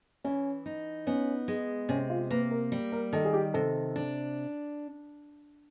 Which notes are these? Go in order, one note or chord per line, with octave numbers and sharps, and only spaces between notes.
E3 C#4
D#4
B3 C#4
G#3
C3 C#4
F4
A#3 B4
A#4
G3
A#4
D#3 A4
G#4
G4
C3 A4
D4